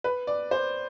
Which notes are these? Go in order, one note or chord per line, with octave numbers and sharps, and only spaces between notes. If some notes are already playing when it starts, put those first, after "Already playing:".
B4
D5
C5